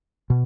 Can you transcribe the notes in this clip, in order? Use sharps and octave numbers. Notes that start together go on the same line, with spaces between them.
B2